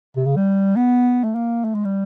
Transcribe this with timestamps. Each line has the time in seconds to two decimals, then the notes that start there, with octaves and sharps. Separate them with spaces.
0.16 C3
0.26 C#3
0.37 G3
0.76 B3
1.24 A3
1.35 A#3
1.64 A3
1.75 G#3
1.85 G3